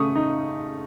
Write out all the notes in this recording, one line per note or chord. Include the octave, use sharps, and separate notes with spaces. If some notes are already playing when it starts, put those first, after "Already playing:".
Already playing: C#3 A3 C#6 D#6
D#4